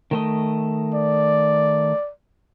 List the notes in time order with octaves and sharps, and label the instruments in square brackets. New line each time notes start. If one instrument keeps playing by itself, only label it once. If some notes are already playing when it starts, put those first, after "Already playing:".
[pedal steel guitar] D#3 A3 D#5
[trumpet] D5